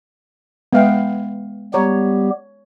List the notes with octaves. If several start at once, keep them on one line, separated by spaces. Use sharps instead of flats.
G#3 B3 E5 F5 G5
G3 B3 G4 C#5 A#5